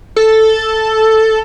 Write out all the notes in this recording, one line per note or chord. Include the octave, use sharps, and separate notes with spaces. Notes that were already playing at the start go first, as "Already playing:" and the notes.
A4